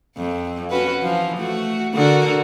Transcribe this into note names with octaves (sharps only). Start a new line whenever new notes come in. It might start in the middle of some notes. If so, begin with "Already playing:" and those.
F2
C#4 F#4 B4
E3 F3
A3 F#4
D3 F#4 A#4